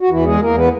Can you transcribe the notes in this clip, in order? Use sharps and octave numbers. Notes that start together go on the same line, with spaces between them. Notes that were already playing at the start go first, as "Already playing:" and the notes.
F#4
E2 E3 E4
G#3 G#4
E2 A#3 A#4
B3 B4